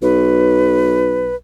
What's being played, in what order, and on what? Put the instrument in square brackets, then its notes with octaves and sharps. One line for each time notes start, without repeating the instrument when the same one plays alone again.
[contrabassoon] B1 [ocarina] B4